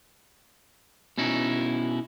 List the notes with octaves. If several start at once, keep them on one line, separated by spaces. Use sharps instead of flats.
B2 C#4 D#4 E4